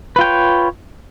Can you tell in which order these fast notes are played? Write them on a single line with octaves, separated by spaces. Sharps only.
B4 F4 G5 C#5